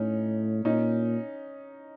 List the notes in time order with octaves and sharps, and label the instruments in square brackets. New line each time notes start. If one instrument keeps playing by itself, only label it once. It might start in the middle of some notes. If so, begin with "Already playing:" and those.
Already playing: [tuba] A2 [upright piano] C#4 D#4
[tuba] A#2 [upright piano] C#4 D#4